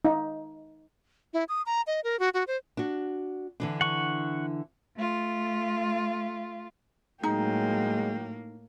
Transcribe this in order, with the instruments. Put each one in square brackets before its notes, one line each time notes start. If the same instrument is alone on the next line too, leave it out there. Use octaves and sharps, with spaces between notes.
[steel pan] D#4
[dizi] E4
D#6
A#5
D#5
A#4
F#4
F#4
C5
[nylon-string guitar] D4 F#4
D3 E3 D4
[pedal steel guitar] F#5 C#6
[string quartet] A3 F4
[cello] A2 A#3 [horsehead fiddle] F#3 G5 [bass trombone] G#3 [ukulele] D#4